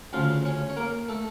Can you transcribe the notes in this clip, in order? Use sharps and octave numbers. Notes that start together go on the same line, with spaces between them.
D2 C#3 F3 F4 F5
C#4 C#5
C#5
A#3 A#4
A3 A4